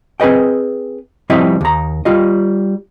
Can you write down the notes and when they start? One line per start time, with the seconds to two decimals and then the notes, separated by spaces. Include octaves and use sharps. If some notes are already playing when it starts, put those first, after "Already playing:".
0.20 C4 G#4 B4 D#5 G5
1.30 F3 G3 C4 E4 D#5 E5
1.61 D#2 A#5
2.05 G3 F4 D#5